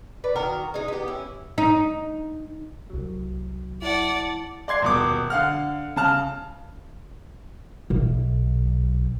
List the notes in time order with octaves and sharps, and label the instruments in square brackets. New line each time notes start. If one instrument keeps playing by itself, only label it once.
[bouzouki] B4 D5
D#3 F#4 A#4
G#3 D#4
B3 G4
C#4 E4
[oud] D#4
[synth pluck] C2 F#3
[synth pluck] E4 A5 [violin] D5 F#5
[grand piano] D5 C6 G#6 C7
D#1 B2 D6
D3 F5 F#5 F6
C#3 A5 F6
[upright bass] B1